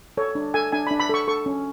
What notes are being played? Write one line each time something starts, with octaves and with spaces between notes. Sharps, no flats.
A4 C#5
D4
A4 G#5
D4 G#5
B5
D4
B5
A4 C#6
A4 C#6
C#4